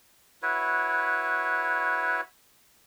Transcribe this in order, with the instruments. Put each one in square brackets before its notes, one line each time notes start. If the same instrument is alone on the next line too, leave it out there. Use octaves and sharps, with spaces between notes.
[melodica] E4 F#4 B4 C#5